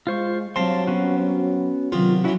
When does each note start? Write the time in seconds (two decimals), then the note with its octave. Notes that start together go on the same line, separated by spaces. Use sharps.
0.07 G#3 F4 C5 C#6
0.56 G2 F#3 C4 F5 A5 C6
0.87 B3 C#4 F#4
1.92 C3 D#3 F#3 B3 F4
2.24 E3 F#3 C#4 E4 F#4